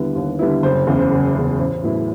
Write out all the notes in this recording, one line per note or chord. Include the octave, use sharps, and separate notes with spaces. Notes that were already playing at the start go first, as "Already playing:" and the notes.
Already playing: D#2 D3 G3 B3 E4 B4
D#2
D3 G3 B3 E4
F#1 C5
E2 C#3
C5
F#1
E2 C#3
A1 C5
A2 F#3 B3 E4